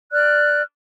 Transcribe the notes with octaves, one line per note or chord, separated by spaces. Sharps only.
D5 F6 F#6